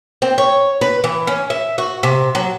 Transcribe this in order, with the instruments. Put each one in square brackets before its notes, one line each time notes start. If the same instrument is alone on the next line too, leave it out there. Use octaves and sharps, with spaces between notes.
[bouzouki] C4
C#5
B4
E3
C#4
E5
F#4
C3
F#3